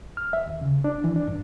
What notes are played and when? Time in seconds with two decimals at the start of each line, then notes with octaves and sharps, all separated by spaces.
0.17 F6
0.33 E5
0.46 D#2
0.61 C#3
0.84 D4
1.04 E3
1.16 D4
1.28 G2